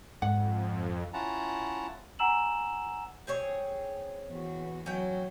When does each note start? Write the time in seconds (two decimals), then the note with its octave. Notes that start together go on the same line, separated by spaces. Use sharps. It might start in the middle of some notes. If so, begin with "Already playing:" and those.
0.22 F2 G#2 F#5
1.14 C#4 E4 F4 F#5 A5 A#5
2.19 F#5 G#5 A#5 E6 E7 F#7
3.27 C4 G#4 C#5
4.29 E2 F#4
4.86 F#3 C#4 G5